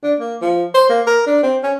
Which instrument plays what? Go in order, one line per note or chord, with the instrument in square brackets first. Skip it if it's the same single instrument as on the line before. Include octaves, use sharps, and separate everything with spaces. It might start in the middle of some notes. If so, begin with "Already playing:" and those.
[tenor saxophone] D4
A#3
F3
C5
A#3
A#4
D4
C4
C#4